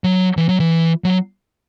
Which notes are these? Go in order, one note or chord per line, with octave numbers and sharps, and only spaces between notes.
F#3
E3
F#3
E3
F#3